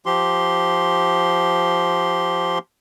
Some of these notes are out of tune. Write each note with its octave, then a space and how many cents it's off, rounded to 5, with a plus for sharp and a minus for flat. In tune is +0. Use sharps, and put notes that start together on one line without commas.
F3 +0 G4 -10 C6 +0